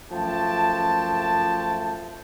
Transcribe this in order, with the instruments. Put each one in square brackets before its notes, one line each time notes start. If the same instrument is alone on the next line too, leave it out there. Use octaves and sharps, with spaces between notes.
[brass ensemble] F#2 F3 A3 G5 A5